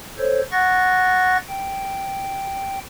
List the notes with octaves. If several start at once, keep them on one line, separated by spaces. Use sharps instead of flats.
A4 C5 C#5
F#5 C#6 F#6 A6 A#6
G5